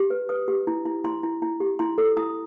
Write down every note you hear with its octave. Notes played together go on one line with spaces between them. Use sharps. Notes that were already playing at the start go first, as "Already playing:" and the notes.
Already playing: G4
B4
B4 D#6
G4
E4
E4
E4 C6
E4
E4
G4
E4 C6
A4
E4 D#6